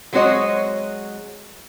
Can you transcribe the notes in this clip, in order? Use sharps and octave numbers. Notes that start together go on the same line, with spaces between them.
F#3 G#3 C4 F#4 C#5 D#5